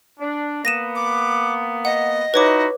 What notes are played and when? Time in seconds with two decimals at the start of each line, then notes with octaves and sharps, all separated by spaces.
0.19 D4
0.65 A#3 B3 A#6 D#7 E7
0.96 D6
1.85 D#5 F#5
2.34 D#4 E4 F#4 B4 C#5 D6